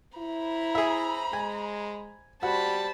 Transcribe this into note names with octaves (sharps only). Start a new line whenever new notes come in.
E4 C5 A#5 B5
G#4 E5
G#3 G#5
G3 F#4 C5 A5 B5